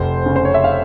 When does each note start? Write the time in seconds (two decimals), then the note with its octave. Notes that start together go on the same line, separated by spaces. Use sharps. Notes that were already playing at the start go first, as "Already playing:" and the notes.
Already playing: F1 C5
0.26 C#3
0.36 C5
0.45 C#5
0.54 E5
0.64 F5